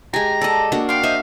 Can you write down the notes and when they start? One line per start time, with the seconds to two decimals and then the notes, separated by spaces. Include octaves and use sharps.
0.14 G#3 G4 G#5 A#5
0.41 A4 D5 D#5
0.72 A#3 D4 F#4
0.89 F5 G5 C6
1.04 C5 D#5 E5